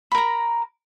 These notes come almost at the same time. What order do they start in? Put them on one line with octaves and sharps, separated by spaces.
B5 A#4 A#5